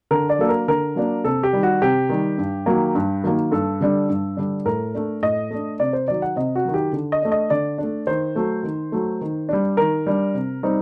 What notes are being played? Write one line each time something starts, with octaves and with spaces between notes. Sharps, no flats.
D3 A#4
D5
F#3 A#3 D4 A4
A#4
D3 A#4
F#3 A#3 D4
C3 A4
G4
D#3 G3
F#4
C3 G4
D#3 G3
G2
D#3 F#3 A#3
G2
D#3 F#3 A#3
G2 A4
D3 G3 D4
G2
D3 G3 D4
A2 A#4
A3 D4
A2 D#5
A3 D4
C3 D5
C5
D#3 F#3 D5
F#5
C3 D#5
F#4
D#3 F#3
G4
D3
D#5
A3 D4
D#5
D3 D5
D4
A3
D#3 C5
F#3 A3
D#3
F#3 A3
D#3
G3 D4
D#3 A#4
G3 D4
C3
G3 C4 D#4